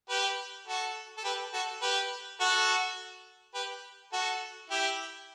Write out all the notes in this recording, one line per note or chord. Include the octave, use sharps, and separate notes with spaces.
G4 B4
F#4 A4
A4
G4 B4
F#4 A4
G4 B4
F#4 A4
G4 B4
F#4 A4
E4 G4